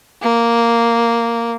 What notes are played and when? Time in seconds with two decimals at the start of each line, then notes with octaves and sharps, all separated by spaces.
0.22 A#3